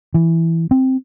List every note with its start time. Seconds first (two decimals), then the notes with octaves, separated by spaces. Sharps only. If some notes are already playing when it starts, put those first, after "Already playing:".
0.14 E3
0.71 C4